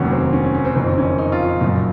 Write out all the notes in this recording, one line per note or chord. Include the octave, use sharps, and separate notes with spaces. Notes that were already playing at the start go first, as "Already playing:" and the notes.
Already playing: F1 D#2 D#3 F#3 C#4
C4
C#4
C#4
C#4
C4
F#1 F2 D#3 C4
C#4
D#4
F4
F#1 F#2 F3